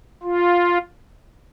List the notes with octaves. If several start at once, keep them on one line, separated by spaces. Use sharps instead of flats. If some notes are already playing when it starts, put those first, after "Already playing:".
F4